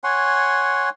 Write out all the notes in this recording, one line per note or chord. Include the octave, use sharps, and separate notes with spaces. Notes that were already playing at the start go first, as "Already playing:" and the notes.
C#5 F#5 G#5 C6